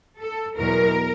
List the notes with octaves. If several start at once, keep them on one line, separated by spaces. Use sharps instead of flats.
A4
E2 B2 F#3 A#4